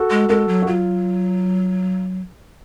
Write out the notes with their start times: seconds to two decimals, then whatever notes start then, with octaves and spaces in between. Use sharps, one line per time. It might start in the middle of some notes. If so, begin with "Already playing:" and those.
Already playing: F#4 A4
0.11 G#3
0.29 G#3 F#4 A4
0.48 F#3
0.62 F#4
0.67 F#3 F4